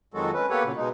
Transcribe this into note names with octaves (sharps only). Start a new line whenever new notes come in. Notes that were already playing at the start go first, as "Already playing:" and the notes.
F2 D#3 F#3 G#3 F#4 A4
C#4 B4
A#3 B3 G4 A4 B4 C#5
A#2 C#3 F#3
B2 G#3 D#4